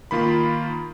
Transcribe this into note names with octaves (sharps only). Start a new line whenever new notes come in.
D#3 A#3 F4 B5